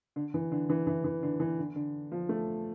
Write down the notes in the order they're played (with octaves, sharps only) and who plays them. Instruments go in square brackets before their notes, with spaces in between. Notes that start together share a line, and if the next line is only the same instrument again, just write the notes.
[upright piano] D3
E3
D3
E3
E3
E3
D3
E3
D3
D3
F3
A3